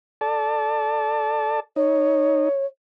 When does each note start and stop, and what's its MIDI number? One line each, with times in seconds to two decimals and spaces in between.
0.21 1.60 69
0.21 1.60 74
0.21 1.60 81
1.76 2.49 63
1.76 2.66 73